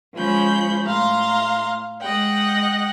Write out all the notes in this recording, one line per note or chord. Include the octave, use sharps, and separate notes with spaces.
F3 G#3 C#4 B5 G6
A2 F5 A#5 C6
G#3 D#5 F#5 G5